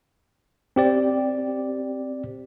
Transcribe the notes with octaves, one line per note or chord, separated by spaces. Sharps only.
C4 G4 D5